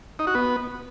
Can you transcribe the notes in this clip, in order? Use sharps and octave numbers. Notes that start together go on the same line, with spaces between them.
D#4
F#4
B3